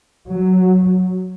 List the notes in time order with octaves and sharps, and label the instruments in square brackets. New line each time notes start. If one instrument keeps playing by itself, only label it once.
[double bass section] F#3